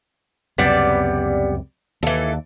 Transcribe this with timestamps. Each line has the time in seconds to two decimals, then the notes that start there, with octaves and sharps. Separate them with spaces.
0.58 C#2 F#2 C3 G3 B3 D5
2.03 D#2 E3 A4